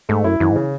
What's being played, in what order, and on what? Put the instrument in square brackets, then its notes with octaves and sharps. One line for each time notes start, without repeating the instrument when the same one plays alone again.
[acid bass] G#2 [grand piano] A3
[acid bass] F#2 [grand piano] E4
[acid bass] F#2 [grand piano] E3
[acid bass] G#2
[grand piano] C#3